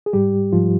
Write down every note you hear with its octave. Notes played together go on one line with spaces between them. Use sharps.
G#4
G#2 G3 G4
G#2 F3 F4